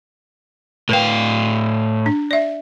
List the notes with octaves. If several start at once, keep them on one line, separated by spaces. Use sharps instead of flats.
A2 A#4 B4 F5 G5
D4
D5 E5